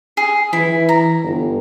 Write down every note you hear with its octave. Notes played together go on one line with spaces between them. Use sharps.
G#4
E3 E4
A#5
G1